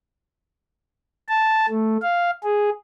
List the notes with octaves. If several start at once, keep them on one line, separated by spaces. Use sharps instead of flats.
A5
A3
F5
G#4